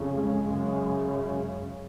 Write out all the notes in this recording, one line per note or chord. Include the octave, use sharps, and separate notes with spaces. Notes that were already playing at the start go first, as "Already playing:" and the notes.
Already playing: F2 C#3
G#3
F#2 C#3